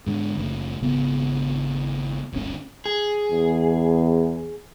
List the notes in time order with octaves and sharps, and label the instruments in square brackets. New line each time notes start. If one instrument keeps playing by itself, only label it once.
[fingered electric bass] G#2 D3
F#1 A3
G#1 C#3 B3
D1 G1 D2 C#4
[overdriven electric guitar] G#4
[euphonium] E2